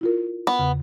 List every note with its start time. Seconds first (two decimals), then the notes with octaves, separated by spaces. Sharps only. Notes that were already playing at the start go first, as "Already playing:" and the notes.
0.01 E4 F4 A#4
0.47 B3
0.59 E2 C#3